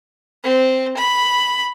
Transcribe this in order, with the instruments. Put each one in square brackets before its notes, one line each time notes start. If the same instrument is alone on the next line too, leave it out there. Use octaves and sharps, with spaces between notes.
[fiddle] C4
B5